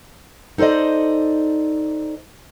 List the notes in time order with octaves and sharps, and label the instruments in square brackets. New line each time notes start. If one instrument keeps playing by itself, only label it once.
[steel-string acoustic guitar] D#4 A4 C5 D5 D#5